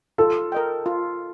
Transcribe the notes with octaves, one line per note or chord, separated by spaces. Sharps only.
F4 A4
A#4 D#5 G5
F4